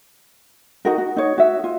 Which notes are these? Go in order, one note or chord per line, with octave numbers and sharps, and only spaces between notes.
D#4 F#4 A#4
F#4
D#4 C#5
F#4 E5
F4